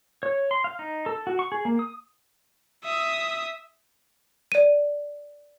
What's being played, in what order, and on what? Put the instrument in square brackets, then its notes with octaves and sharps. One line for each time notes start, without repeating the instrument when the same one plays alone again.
[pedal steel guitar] C#5
C6
F5
D#4
A4
F#4
C#6
G#4
A#3
D#6
[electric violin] E5 D#6
[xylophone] D5 D#7